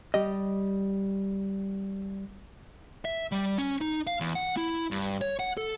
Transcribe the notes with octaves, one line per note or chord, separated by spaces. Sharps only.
G3 G4 D#5
E5
G3
C#4
D#4
F5
E2
F#5
E4
G2
C#5
F#5
A4